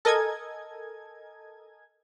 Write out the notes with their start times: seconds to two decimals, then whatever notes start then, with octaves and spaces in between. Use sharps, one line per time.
0.05 A4 A#4 D#5 G#5 G#6